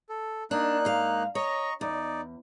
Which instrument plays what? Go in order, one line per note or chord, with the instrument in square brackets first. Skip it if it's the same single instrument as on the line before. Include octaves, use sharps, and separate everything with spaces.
[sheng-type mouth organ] A4
[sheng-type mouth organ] A#3 D#4 F#6 [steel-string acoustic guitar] D4
[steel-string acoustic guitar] G#2 F5
[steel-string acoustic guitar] C#5 [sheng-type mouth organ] D#5 A#5 C#6
[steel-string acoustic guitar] E2 [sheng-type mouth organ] D#4 D5